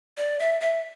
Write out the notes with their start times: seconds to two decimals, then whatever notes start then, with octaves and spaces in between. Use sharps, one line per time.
0.17 D5
0.39 E5
0.61 E5